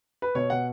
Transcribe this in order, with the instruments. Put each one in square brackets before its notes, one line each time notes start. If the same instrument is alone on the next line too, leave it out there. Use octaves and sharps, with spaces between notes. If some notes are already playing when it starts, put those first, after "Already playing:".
[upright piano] B4
B2 C#5
B2 F#5